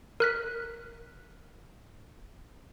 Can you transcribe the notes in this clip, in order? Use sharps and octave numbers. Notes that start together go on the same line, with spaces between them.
A#4 F#6 B6